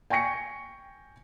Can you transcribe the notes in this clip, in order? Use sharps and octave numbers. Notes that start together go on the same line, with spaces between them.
G5 G#5 C#6 A#6 C#7